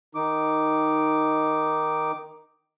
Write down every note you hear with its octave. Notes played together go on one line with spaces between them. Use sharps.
D#3 D#4 D6